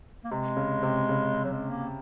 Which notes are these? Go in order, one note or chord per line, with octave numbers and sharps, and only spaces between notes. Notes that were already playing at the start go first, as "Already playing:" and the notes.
A#3
C3 G#3
C#3
C3
C#3
F#3
G#3
A#3